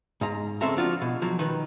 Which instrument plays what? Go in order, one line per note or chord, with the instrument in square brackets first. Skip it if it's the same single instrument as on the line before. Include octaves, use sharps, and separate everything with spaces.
[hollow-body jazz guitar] G#2 A#5
C#2 C#3 C4 A4 E5 A#5
F3 D4 F4 F#4
B2
F3 F#3
D#3 B4